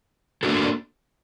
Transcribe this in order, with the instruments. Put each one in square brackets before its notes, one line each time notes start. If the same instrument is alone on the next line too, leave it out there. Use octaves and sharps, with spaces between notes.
[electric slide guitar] A#3 D4 F#4 A4